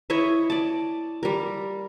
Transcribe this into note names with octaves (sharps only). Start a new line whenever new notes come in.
E4 C#5 D#5 E5
D5 A5
G3 A#4